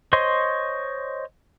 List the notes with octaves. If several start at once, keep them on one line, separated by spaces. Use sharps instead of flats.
C5 C#5 D#5 C6